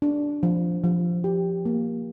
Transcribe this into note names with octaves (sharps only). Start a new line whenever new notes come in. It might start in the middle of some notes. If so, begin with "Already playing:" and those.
D4
F3
F3
G4
A#3